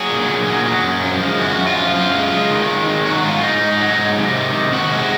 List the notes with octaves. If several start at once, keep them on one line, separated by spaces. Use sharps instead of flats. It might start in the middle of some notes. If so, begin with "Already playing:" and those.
Already playing: F#3 G#4
A#2
A#2
F#3
F#3
F#2
F3
G#3
F#2 F#4
F#2
F4
F3
F#2 F4
G#3
G#3
D#3
G#3
D#3
F#3 F#4
G#2 F4
G#2 D#4
G#2
F#3
G#2
C3
D#3
C3
C3 F#4
G#3